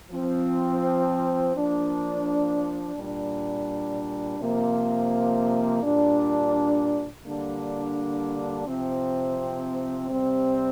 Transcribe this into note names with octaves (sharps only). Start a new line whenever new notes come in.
F3 C4
F3 A#3 D4
A#2 G3 D4
C3 F3 A#3
A#2 G3 D4
D3 G3 A#3 D4
C3 F3 C4
C3 G3 C4